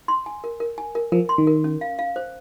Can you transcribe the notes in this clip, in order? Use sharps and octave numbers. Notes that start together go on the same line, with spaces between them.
C6
G#5
A#4
A#4
G#5
A#4
F3 A#4
C6
D#3
A#4
C#4
F5
F5
C5